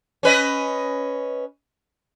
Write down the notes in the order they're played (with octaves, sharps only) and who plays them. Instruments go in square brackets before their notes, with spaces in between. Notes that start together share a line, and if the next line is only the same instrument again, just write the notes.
[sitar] C#4 B4 D#5